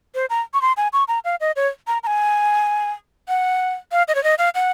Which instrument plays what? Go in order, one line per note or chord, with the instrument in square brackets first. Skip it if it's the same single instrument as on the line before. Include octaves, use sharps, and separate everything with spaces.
[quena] C5
A#5
C#6
C6
G#5
C#6
A#5
F5
D#5
C#5
A#5
A#5
G#5
F#5
F5
D#5
C#5
D#5
F5
F#5